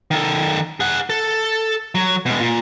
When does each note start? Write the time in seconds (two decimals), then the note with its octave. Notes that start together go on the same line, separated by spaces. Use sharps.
0.11 D#3 A4
0.80 G#4 F#5
1.10 A4
1.95 F#3
2.26 B2 G#3
2.40 A#2